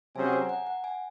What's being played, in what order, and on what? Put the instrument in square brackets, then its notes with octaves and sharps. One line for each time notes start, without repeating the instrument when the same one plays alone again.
[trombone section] C3 F#3 C#4 G#4 C5 [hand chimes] G#5
[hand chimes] F#5
G#5
A#5
F#5
F#5
G#5